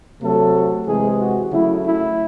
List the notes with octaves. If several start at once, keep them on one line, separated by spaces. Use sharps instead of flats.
C3 F#3 A3 A4
C3 E3 G#3 G#4
F#4
C#3 F#3 A3 E4
E4